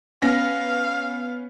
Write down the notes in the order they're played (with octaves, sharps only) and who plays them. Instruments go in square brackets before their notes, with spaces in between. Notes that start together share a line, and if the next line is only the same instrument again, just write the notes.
[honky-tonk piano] B3 C#4 A#6 [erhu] F5